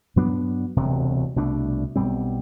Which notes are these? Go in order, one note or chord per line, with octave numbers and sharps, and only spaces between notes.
G2 F#3 B3 D4
E1 D2 C3 F#3
C2 B2 A3 D4
B1 B2 G3 C4